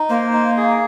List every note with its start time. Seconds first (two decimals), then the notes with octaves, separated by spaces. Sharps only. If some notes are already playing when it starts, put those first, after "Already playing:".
Already playing: D#4
0.09 A#3 C5
0.33 D#4
0.57 G#4